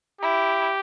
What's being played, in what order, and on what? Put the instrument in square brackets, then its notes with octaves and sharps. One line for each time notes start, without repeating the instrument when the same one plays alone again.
[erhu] E4 [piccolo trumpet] G4